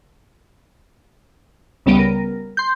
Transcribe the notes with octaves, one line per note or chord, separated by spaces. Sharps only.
C#2 C#3 G3 B3 D7 D#7
A#4
C6 G6